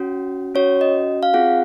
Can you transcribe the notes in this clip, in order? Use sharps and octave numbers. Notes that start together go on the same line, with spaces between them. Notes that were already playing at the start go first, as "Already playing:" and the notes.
Already playing: C#4 F#4
C#4 F#4 C#5
D#5
F5
C4 F4 G#4 F#5